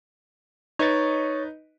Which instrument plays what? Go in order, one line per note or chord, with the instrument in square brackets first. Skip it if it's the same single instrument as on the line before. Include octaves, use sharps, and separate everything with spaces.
[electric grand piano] D#4 B4 D#5 [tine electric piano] C#5 C#6 A6